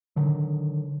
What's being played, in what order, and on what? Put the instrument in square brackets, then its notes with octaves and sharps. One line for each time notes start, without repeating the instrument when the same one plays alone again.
[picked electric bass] D3 D#3 F#3